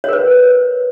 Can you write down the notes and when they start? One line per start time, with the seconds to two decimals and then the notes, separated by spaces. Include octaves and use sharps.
0.04 C#5
0.08 A#4
0.13 B4